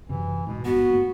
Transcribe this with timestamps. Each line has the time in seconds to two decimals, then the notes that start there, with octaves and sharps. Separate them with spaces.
0.09 F#2 C3 E3
0.47 G#2 B2 F#3 G#3
0.65 G#1 G2 B3 F#4
0.91 G2 A3 A#3